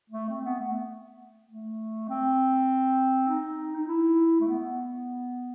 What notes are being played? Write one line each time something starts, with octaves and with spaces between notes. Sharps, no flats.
A3
C4
B3
A3
A3
C4
D#4
D#4
E4
A3
B3